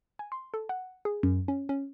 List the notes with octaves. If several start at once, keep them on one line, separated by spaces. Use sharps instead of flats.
G#5
C6
A4
F#5
G#4
F#2
C#4
C#4